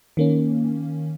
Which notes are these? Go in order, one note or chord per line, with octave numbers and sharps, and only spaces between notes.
D#3 A#3 C#4